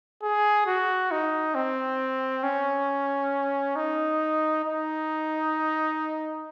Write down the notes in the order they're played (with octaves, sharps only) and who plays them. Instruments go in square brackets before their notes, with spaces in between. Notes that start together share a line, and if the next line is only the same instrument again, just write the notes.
[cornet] G#4
F#4
D#4
C4
C#4
D#4
D#4